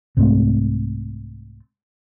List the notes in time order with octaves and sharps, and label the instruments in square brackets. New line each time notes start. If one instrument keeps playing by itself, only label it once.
[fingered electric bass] C2 G#2 A3 C4